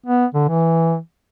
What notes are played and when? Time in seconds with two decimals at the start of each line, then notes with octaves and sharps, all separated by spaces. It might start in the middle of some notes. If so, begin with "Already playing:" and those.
0.06 B3
0.34 D3
0.49 E3